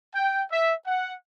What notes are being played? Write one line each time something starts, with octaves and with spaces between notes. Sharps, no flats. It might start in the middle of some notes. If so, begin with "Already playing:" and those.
G5
E5
F#5